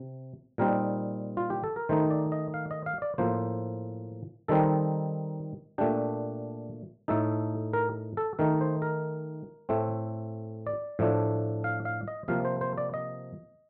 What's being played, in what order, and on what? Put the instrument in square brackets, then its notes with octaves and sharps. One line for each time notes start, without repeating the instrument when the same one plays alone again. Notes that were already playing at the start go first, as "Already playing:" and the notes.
Already playing: [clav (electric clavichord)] C3
A#2 G3 C4 D#4 A#4
F4
G4
A4
A#4
D#3 A3 D#4 C5
D5
D#5
F5
D#5
F5
D5
A2 F3 A#3 C5
D#3 G3 C4 D#4 A4
A#2 A3 D4 G4
A2 A3 D#4 A4
A#4
A4
D#3 A3 D#4 A#4
C5
A#4
A2 A3 C4
D5
A2 F3 A3 D4
F5
F5
D#5
C3 F3 A#3 F5
C5
C5
D5
D#5